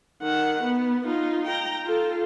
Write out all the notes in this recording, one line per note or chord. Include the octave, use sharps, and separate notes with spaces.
D#3 F#5
B3
D#4 F4
G5 A#5
F4 A4